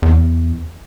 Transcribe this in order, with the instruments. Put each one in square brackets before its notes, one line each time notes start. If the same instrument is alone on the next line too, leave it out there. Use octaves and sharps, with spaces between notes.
[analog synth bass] E2